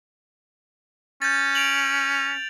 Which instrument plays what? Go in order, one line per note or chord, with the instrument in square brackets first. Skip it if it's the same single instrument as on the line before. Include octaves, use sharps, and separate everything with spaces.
[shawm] C#4 [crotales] G6 A6
[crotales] D7 F7 F#7